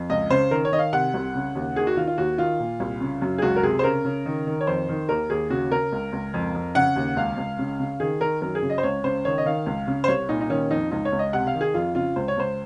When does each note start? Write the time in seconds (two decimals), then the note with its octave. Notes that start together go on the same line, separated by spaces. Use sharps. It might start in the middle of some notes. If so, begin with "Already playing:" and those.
Already playing: F2
0.10 C#2 D#5
0.30 C#3 C5
0.51 D#3 A#4
0.65 C#5
0.72 D#3 D#5
0.79 F5
0.93 C3 F#5
1.14 C2
1.35 C#3
1.55 D#2
1.76 D#3 G#4
1.87 F#4
1.97 D#3 F4
2.07 F4
2.18 D#2 F#4
2.38 D#3 F4
2.60 A#2
2.80 C2
3.01 C#3
3.22 F#2
3.38 G#4
3.42 C#2 F#4
3.56 A#4
3.63 C3 G#4
3.79 C5
3.84 C#3 A#4
4.05 C#3
4.26 D#3
4.47 D#3
4.61 C#5
4.67 F2 C5
4.89 D#3
5.09 D#2 A#4
5.30 D#2 G#4
5.50 C#3 F#4
5.71 C#3 A#4
5.92 C#2
6.13 C#2
6.34 F2
6.55 F2
6.75 C#3 F#5
6.96 D#2
7.17 C#2 F5
7.38 C#2
7.59 C#3
7.80 C#3
8.00 D#3 G#4
8.21 D#3 A#4
8.42 F#2 A#4
8.55 G#4
8.63 C#3
8.70 D#5
8.78 C5
8.83 C#2 C#5
9.04 C#3 C5
9.25 D#3 C#5
9.38 D#5
9.45 D#3 F5
9.66 C#2
9.87 C#3
10.04 C5
10.08 C2 C#5
10.29 A#2 D#4
10.41 D#4
10.50 D#3 C#4
10.71 F2 D#4
10.91 C#2 D#4
11.05 C#5
11.12 C#2
11.19 D#5
11.33 C3 F#5
11.47 F5
11.54 D#3
11.61 G#4
11.74 F2 F4
11.95 C#3 F4
12.16 C#2 C5
12.28 C#5
12.37 C#2 C5